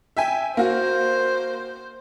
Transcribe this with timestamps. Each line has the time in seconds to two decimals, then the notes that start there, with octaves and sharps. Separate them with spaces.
0.17 E5 G5 G#5
0.57 A#3 F#4 C5